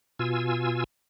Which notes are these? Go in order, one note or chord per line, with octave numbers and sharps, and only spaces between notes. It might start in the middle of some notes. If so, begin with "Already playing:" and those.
B2 F4 G#5 E6